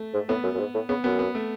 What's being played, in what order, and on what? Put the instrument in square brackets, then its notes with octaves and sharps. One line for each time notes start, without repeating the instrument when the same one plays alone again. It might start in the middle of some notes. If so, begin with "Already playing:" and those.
Already playing: [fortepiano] A3
[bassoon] G#2
[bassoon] A2 [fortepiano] B3
[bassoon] F#2
F#2
G#2
A2
[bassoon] C#3 [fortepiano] B3
[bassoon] F#2 [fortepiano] B3
[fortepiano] B3
A3